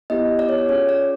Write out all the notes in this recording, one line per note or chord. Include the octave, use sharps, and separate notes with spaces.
B3 E4 G4 D#5
D5
C#5
D5
C#4 F4 G#4 C#5
D5